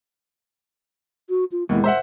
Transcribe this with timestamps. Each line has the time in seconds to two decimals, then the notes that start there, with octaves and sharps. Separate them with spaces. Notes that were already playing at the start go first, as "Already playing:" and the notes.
1.29 F#4
1.52 F4
1.69 D#2 B2 E3 G#3
1.84 C5 E5 F#5